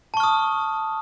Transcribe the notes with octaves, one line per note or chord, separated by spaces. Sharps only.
A5 C#6 D#6 F6